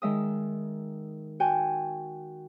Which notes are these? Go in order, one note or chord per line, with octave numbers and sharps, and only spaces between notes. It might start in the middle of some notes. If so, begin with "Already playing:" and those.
D#3 G#3 E5 D#6
F#4 G5 G#5